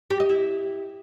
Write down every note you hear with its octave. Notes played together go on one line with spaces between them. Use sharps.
G4
D#5
E4